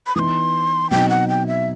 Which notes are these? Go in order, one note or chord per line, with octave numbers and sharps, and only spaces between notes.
B5
E3 B3 D#4 C6 D#6
B2 F#3 C4 D#4 G5
F#5
G5
E5